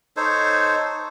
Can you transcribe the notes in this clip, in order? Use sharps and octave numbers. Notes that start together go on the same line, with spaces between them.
D#4 A4 C5 C#5